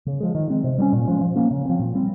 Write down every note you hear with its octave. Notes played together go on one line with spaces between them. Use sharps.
C#3
F3 G#3
D#3
G#3 C4
C3
G3 A#3 C#4
A#2
F3 G#3 C#4
F3
A#3 C#4
C#3
F3 C4
A#2
G3 C4